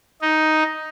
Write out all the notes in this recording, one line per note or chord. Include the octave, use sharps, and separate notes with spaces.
D#4